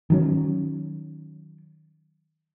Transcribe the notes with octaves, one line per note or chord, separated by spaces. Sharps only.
D#3 F#3 C#4